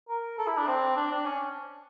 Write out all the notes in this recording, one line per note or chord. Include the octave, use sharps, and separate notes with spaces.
A#4
A4
E4
D4
C4
D4
D4
C#4